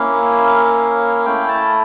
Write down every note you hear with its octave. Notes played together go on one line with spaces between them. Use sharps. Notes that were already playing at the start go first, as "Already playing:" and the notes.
Already playing: A#3 C#4 E4 F5
A3 E4 G5
A5